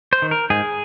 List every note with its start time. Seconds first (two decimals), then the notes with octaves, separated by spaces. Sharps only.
0.13 C5
0.22 D#3
0.31 A#4
0.50 G#2 G#4